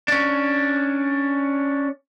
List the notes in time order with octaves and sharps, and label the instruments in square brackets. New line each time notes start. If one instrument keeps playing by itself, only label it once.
[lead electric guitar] C#4 D4